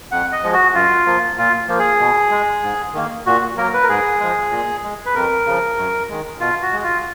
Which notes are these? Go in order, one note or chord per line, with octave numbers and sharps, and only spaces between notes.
F2 F#5
D#5
F3 G#3
F#4
F#2 F4
F3 A#3
A#2 F4
F3 A#3
G#4
B2
G#3
G#2
D#3 A#3
A#2 F#4
F#3 A#3 A#4
B4
A#4
G#2 G#4
F3 G#3
A#2
G#3
B4
F2 A#4
C#3 F3
F#2
D#3 G#3
B2 F4
F#4
G#3
F4